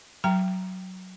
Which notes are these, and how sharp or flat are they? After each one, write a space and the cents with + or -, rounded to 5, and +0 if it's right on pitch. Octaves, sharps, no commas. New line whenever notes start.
F#3 +10 G5 -10 A#5 +0